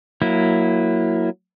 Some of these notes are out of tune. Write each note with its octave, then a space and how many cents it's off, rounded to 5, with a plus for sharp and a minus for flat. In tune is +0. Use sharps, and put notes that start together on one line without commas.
F#3 -10 A#3 +0 E4 +0